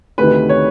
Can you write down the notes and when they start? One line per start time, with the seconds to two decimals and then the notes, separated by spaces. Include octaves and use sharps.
0.18 D2 C3 D#3 B4
0.49 C#5